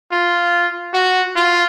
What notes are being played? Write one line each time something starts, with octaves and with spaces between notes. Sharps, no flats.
F4
F#4
F4